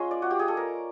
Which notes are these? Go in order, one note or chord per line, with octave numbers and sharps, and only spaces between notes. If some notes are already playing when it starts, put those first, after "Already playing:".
Already playing: G#3 C#4 F4
D5
F#4
G4
G#4
A4
A#4